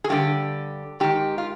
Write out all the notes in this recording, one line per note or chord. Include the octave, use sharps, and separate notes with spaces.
G#4
G2 D3 G4
G#2 D#3 G4
F4